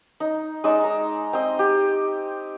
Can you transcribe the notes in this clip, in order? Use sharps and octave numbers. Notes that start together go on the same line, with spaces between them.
D#4
G#3 D#4 D5 E6
A#5
C4 D#5
G4